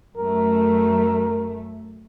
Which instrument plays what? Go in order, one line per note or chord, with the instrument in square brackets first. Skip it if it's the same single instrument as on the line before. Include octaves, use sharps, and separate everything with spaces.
[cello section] F#2 A3 [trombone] A#4